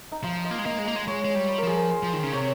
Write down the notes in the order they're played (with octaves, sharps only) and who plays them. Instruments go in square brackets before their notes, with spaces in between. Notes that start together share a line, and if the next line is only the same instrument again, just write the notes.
[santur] D#4
[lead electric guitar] F3 [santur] F4
[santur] D#5
[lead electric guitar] A#3
G#3
[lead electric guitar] A#3 [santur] D#5
[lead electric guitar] G#3
[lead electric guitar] A#3 [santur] D#5
[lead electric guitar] G#3
[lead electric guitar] G#3 [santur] C#5
[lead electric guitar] G#3
G3
[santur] C5
A#4
[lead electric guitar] F3 [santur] G#4
[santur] A#4
C5
[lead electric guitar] F3
D#3
C#3
[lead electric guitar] C3 [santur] C#5